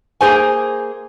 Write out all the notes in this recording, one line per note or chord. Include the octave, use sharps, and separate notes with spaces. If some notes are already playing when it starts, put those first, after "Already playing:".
A#3 G#4 C5 G#5